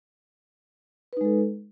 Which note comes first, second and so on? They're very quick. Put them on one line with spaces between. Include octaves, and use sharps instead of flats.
B4 D#4 G#3 A4